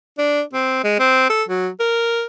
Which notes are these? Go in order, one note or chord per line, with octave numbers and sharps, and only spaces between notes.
D4
C4
G#3
C4
A4
F#3
A#4